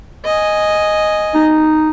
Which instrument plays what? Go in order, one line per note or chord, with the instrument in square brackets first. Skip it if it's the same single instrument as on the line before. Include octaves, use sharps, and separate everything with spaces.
[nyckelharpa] D#5 G#5
[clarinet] D#4